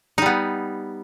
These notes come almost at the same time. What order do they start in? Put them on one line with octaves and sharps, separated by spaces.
D#4 G3 B3